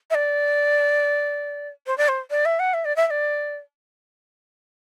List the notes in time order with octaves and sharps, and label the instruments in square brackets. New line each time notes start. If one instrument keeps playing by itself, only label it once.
[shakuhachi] E5
D5
C5
D5
C5
D5
E5
F#5
E5
D5
E5
E5
D5